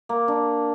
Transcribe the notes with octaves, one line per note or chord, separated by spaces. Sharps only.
A#3
D4